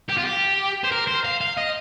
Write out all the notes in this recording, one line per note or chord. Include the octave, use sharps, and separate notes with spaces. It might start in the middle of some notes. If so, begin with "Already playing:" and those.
G4
F4
G4
C5
A#4
C5
F5
F5
D#5